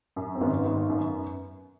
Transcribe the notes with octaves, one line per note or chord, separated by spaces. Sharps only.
F#2
C4
G#1 B3 C#4
G#1
F#2